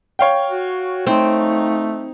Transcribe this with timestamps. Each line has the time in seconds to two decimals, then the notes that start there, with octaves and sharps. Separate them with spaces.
0.19 C#5 F5 G5
0.50 F#4
1.07 A3 C4 D#4